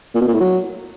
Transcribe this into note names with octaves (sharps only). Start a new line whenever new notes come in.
A#2
B2
A#2
A2
F#3